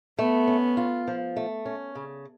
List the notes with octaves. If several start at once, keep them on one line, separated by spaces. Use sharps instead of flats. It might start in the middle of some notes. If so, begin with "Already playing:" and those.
A3 B3
C#4
F4
F3
A3
C#4
C#3